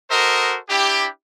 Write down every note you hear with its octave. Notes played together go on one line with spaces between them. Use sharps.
F#4 A4 A#4 C5 D#5
D4 E4 G4